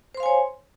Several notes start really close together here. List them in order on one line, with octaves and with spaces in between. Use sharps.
C5 C6 F5 G#5 C#5